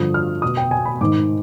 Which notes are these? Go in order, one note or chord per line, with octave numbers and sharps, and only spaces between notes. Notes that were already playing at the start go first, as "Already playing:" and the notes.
Already playing: G2 D3 F3 D#6
F6
B2 D#6
G5
G#5
B5
G#2 D#3 D6